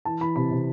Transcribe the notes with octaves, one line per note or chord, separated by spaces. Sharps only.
E3 A5
E3 B5
C3 B5
C3